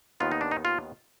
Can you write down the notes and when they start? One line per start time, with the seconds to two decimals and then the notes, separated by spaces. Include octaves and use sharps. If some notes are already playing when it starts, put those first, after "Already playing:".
0.20 D#2 D#3 B3 F4
0.32 D#4
0.41 D4
0.51 D#4
0.65 F4